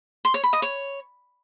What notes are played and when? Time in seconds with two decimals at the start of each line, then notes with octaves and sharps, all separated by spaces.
0.25 C6
0.34 C#5
0.43 B5
0.53 D#5
0.62 C#5